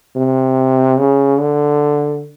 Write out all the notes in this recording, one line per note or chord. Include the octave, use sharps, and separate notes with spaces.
C3
C#3
D3